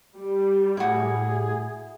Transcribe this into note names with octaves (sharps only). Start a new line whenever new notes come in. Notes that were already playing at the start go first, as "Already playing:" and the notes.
G3
A2 E4 F#4 G#4